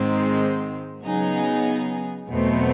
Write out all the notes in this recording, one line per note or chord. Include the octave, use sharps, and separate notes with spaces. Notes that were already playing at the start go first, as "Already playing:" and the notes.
Already playing: G#2 D#3 G#3 C4
C#3 F#3 B3 D#4 G#4
E2 B2 F#3 A3 C4